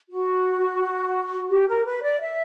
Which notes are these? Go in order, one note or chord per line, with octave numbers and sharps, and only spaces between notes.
F#4
G4
A#4
B4
D5
E5